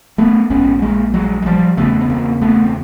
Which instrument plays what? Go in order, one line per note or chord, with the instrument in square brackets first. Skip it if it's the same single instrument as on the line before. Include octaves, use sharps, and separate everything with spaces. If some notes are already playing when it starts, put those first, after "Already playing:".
[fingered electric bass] A3 B3
A#1 G#2 B3 C#4
G#3 A#3
F#3 G#3
G#3
F3 G3
E1 D#2 C#3 A3 B3
B3
A#3 C4
A3 B3
C4